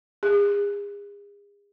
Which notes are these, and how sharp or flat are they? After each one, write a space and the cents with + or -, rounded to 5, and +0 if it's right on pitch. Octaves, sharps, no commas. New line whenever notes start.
G#4 -40